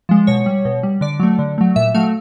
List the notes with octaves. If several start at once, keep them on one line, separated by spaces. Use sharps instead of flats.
F3 G#3
B2 C#5
G3
B2
G3
D3 D5
F#3 A3
D3
F#3 A3
A#2 E5
F#3 A3 F5